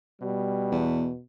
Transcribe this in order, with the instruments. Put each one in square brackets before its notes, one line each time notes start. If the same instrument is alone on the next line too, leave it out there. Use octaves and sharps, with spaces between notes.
[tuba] B2 [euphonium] G3
[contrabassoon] E2